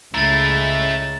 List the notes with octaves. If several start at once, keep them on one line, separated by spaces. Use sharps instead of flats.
C#2 G#3 A3 C#4 E4 A#5 A6